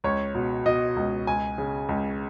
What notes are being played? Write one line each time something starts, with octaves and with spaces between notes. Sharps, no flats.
C#2 C#5
B2
B2 D#5
C#2
C#2 G#5
C#3
C#2